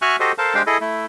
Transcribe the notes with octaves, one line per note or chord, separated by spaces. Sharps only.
F#4 E5 G#5 C#6 F6 F#6
F#4 G4 A4 C5 D#5
A4 A#4 C5 F5 A5
G#3 D4 G4 C5 F5 G5
E4 G#4 A4 D#5
A3 E4